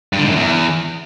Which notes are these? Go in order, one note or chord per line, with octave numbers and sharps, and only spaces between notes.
G2
D3
G#2
F#2
E2